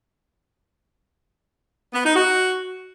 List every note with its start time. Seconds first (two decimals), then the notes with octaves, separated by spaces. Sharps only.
1.93 B3
2.04 D#4
2.15 F#4